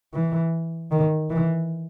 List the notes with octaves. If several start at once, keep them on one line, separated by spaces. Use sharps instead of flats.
E3
D#3
E3